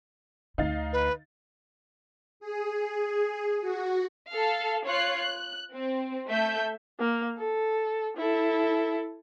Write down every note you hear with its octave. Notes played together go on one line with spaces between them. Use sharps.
D2 D3 D#4 F5 A6
B4
G#4
F#4
A4 F5
F4 C#5 F#6 C7
F#6
C4
A3 E5 G6
A#3
A4
E4 A4